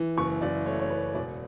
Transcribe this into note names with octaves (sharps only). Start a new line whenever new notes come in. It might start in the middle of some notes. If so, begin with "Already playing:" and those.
Already playing: E3
F#1 C#6
F#1 D5
A3 C#5
C#5
F#1 B4
E1 D5